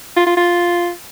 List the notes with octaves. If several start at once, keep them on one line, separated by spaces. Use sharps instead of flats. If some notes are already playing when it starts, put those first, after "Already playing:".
F4
F4
F4